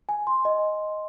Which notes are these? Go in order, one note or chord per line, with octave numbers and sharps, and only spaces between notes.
G#5
C6
D#5